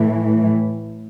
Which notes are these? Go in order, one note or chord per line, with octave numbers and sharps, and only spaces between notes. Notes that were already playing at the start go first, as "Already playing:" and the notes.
Already playing: A2 E3